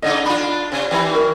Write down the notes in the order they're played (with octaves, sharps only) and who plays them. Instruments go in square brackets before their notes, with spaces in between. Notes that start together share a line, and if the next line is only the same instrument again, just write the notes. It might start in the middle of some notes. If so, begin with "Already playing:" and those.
[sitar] A2 C#3 D#4 [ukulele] D#5
[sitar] D4 F4 [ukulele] B5
[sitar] C3
[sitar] D#3 E3 [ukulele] G4 B5
[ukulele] F#4 A#4